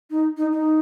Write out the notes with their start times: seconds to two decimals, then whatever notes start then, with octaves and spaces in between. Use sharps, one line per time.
0.10 D#4
0.37 D#4
0.51 D#4